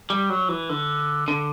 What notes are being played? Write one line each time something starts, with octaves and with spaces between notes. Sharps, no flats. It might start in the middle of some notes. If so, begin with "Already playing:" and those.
G3
F#3
E3
D3
D3